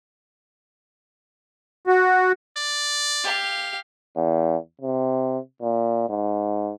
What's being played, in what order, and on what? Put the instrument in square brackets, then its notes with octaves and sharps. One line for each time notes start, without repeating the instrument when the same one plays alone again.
[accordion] F#4
[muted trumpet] D5
[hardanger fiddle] G4 F5
[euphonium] E2
C3
A#2
G#2